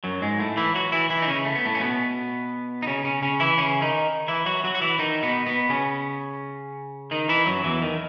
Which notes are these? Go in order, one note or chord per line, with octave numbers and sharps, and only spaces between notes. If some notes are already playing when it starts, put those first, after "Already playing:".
F#2 F#3
G#2 G#3
A2 A3
E3 E4
F#3 F#4
E3 E4
E3 E4
D#4
C#3 C#4
A3
B3
A2 A3
C#4
B2 B3
D#4
C#3 C#4
C#3 C#4
C#3 C#4
E3 E4
C#3 C#4
D#3 D#4
E3 E4
F#3 F#4
F#3 F#4
F#4
E3 E4
D#3 D#4
B2 B3
B2 B3
C#3 C#4
D#3 D#4
E3 E4
F#2 F#3
E2 E3
D#3